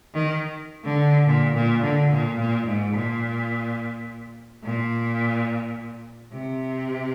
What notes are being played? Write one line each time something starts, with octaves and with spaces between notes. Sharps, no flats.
D#3
D3
A#2
A#2
D3
A#2
A#2
G#2
A#2
A#2
C3